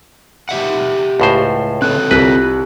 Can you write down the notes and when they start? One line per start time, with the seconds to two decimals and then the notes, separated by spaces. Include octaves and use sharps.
0.49 G4 E5 F#5
1.20 C#2 A2 C5
1.82 C4 A4 C#5 F#6
2.11 C2 F4 B4 F#6